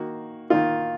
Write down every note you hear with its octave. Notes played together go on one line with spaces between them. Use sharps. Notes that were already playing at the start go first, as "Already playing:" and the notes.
Already playing: D#3 A#3 D#4 F#4
D#3 A#3 D#4 F4